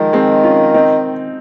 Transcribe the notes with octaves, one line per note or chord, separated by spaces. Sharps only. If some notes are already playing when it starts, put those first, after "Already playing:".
Already playing: D#3 F3 G#3
G#3 C4
C#4 F4
C4 D#4